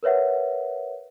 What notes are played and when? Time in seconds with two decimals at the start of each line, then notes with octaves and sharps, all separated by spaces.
0.03 A#4 B4 C#5 E5 F#5